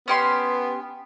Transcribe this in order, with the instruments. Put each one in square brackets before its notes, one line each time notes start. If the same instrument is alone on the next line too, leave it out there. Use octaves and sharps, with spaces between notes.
[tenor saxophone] B3 [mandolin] C#4 G4 C6